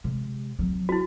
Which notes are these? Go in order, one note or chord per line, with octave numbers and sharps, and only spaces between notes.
C3 G#3
F#3 C4
E4 F#4